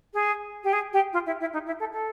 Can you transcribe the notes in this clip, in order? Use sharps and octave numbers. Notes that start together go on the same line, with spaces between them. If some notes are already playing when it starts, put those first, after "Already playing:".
G#4
G4
G#4
G4
F4
E4
E4
D#4
E4
A4
A4